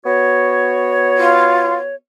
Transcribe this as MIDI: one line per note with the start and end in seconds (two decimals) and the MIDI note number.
0.05 1.95 59
0.05 1.95 66
0.05 1.95 73
1.17 1.74 65